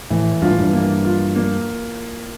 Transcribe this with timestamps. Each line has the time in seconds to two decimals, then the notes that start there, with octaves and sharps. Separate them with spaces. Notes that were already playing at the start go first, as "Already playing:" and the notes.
0.10 A2 E3
0.42 G2 F4
0.51 A2
0.59 G2
0.73 A#3
1.05 F4
1.36 A#3